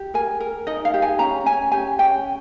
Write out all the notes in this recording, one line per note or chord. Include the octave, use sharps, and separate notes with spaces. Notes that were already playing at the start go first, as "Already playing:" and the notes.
Already playing: G4
A#4 G#5
A#4
D#4 D#5
F5
G4
G#5
C#4 A#5
C#4 G#5
G4 G#5
C#4 G5